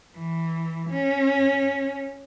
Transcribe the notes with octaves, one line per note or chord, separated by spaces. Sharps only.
E3
C#4